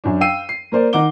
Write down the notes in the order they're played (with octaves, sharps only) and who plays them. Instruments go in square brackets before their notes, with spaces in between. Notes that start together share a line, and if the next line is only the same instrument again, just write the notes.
[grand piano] F#2 D4
F5 G5 E6 C7 D#7
C7
A#3 A#4 C5 D5
D#3 D#4 F#5 D6 G7